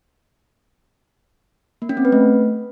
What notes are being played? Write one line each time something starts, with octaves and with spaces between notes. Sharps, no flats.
A#3
C#4
C4
B4
A3